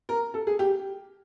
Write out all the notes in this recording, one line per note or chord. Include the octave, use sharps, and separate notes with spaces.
A#4
A4
G#4
G4